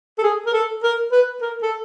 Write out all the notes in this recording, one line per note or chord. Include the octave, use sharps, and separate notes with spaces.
A4
G#4
A#4
A4
A#4
B4
A#4
A4